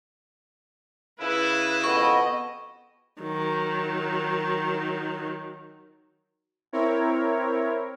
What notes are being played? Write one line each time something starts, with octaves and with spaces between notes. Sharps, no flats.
C#3 E4 B4
F2 B2 B3 D#5 C#6
D#3 F#3
C4 E4 A#4 C#5